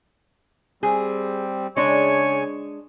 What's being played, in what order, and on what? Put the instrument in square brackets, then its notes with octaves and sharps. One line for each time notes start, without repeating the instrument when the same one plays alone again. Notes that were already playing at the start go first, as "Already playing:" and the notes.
[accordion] G3 C4 [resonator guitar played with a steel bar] G#4
[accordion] C#3 G#5 [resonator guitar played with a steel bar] G#3 D4 [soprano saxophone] C#5